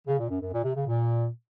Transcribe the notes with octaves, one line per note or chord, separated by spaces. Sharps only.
C#3
A#2
F#2
F#2
A#2
C3
C#3
A#2